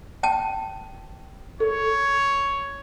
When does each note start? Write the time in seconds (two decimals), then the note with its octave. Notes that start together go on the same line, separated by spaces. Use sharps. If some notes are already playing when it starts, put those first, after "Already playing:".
0.23 G5 A5
1.60 A4 C#5